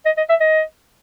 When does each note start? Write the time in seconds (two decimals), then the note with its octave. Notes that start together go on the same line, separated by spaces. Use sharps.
0.06 D#5
0.17 D#5
0.29 E5
0.41 D#5